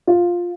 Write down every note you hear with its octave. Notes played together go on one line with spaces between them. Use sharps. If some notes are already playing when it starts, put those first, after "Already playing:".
F4